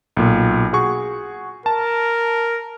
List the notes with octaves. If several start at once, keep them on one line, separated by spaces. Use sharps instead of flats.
B1 A#2
F#4 G#4 C#6
A#4 A5